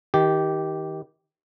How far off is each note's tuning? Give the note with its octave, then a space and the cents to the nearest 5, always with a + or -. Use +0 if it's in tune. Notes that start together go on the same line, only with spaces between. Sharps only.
D#3 +25 G4 -10